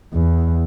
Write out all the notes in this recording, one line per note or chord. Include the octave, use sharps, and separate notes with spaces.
E2